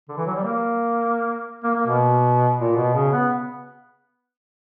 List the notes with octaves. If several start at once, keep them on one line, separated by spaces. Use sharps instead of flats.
D3
E3
F#3
G3
A#3
A#3
A#3
B2
A#2
B2
C#3
B3